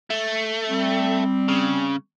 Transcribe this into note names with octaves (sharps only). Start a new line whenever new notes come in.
A3
G3 C4
C#3